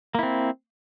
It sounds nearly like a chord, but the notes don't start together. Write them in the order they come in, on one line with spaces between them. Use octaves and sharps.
A#3 E4 C4